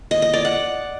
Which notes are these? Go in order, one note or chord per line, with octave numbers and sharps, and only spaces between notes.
D#5
D#5
D5
F#5